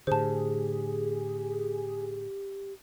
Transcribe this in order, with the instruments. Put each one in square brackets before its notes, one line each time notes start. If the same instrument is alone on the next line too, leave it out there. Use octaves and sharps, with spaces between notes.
[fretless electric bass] A2 D3 [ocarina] G4 [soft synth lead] G#4 [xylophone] C5 A5